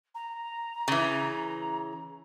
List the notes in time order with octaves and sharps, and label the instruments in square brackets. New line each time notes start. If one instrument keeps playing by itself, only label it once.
[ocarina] A#5
[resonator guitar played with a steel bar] C#3 E3